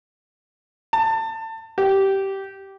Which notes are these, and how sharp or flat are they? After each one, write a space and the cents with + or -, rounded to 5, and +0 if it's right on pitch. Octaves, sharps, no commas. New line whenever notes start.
A5 +25
G4 -15